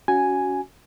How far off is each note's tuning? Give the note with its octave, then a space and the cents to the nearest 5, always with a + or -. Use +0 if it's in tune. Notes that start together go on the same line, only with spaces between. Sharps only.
C#4 +20 F#4 +0 G#5 +0